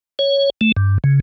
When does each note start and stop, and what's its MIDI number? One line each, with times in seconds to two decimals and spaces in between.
0.19 0.50 73
0.61 0.72 57
0.77 0.98 43
1.04 1.20 49